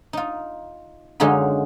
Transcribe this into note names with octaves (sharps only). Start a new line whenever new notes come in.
D#4 F4
F#2 D3 G#3 C#4 D#4 F4